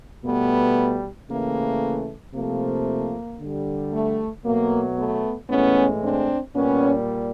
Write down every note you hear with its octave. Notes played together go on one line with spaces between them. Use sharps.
B2 G3 A3 B3
C#3 E3 A3 A#3
C3 F3 A3 A#3
D3 G3
A3
B2 F#3 A3 A#3
A3 B3
A2 E3 G#3 B3 C#4
C4 D4
A#2 G3 B3 C#4